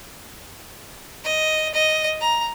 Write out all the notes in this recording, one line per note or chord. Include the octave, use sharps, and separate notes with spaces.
D#5
D#5
A#5